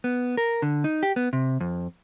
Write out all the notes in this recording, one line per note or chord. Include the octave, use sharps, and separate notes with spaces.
B3
A#4
D3
D#4
G4
B3
C3
F2